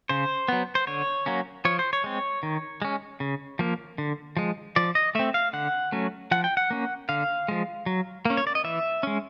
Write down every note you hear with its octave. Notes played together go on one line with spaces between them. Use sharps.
C#3 C5
F#3 B3
C5
D3 C#5
F#3 A#3 C#4
F3 C#5
C5
C#5
G#3 C4
D#3
G#3 C#4
C#3
F3 A#3
D3
F3 G#3
F3 D5
D#5
A3 C4 E5
F5
D3 F#5
F#3 A3 C#4
F3 F#5
G5
F#5
A#3 C#4
D3 F5
F3 G#3
F#3
A#3 C#4
C#5
D5
D#5
E3 E5
G#3 C#4